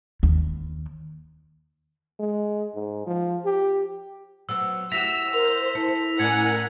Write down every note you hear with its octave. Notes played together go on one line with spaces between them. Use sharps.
D#2
G#3
G#2
F3
G4
F#3 B3 C4 E6
E4 F#4 G4 E6 A#6 B6 F7
A#4 C5 F7
E4 A4
A2 C#4 A#4 D5 F#5 G#5 G#6 C#7